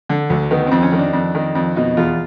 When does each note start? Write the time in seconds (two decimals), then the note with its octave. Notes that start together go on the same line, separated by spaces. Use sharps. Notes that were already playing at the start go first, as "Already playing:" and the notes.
0.09 D3
0.30 D2
0.51 D#3 B3
0.67 F2 C4
0.82 C#4
0.92 D#3
0.98 D4
1.13 F2
1.35 D#3
1.55 F2
1.76 B2 D#4
1.97 E2 F4